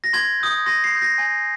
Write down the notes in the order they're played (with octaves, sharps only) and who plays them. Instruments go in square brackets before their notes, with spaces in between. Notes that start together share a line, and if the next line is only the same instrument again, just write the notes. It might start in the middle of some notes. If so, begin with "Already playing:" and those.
[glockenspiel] A#6
C6 G#6
D#6 G6
C6 A#6
C7
D#6 G6
A#6
G#5